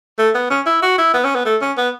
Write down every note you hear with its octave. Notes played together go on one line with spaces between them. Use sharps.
A3
B3
C#4
E4
F#4
E4
B3
C#4
B3
A3
C#4
B3